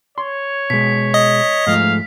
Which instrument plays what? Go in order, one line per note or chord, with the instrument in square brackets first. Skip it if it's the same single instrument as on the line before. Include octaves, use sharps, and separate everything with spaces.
[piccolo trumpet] C#5 [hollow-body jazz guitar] C6
[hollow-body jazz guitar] B2 G#3 [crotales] B6
[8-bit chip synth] D#5
[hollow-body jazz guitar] G#2 F3 A3 [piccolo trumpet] F5